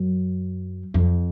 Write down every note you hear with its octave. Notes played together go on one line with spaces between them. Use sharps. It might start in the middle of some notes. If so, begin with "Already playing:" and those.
Already playing: F#2
F2